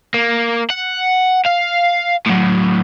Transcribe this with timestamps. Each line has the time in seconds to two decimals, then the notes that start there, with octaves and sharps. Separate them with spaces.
0.14 A#3
0.70 F#5
1.46 F5
2.26 A2 F#3